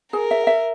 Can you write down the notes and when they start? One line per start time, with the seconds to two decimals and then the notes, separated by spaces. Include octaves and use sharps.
0.12 G#4 A#4
0.31 E5
0.47 E5